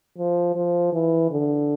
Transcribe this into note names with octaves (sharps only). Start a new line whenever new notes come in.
F3
F3
E3
D3